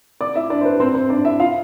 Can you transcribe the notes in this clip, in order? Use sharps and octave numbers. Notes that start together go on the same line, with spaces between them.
D5 D6
E4 E5
D4 D5
C5
B4
C4 C5
C4 C5
D4 D5
E4 E5
F4 F5